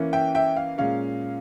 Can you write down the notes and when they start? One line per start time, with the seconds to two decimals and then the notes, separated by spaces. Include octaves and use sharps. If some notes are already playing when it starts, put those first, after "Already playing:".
Already playing: E3 A#3 C#4
0.13 E5 G5
0.35 E5 G5
0.57 F5
0.78 A#2 G#3 C#4 F5